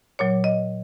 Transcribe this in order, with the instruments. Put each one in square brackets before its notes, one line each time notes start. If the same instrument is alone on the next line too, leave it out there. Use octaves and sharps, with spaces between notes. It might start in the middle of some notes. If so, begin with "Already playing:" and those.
[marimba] A#2 F#3 C#5
D#5